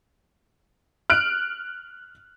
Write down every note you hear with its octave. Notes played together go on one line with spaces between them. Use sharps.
F6 F#6 D7